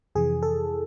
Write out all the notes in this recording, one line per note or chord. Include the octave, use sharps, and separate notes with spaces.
F2 C3 E3 G#4
A4